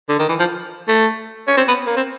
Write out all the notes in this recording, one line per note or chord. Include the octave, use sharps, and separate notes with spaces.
D3
D#3
E3
F3
A3
C#4
C4
B3
A#3
C4